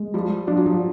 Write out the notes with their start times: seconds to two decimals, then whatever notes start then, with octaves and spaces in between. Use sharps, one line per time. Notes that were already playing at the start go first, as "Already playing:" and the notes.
Already playing: G#3
0.14 F3 G3
0.47 F3 D4
0.57 F#3
0.66 F3